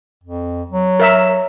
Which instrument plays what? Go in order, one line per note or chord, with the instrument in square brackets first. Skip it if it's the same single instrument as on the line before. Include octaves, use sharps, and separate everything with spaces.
[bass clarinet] F2
F#3
[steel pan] A#4 E5 E6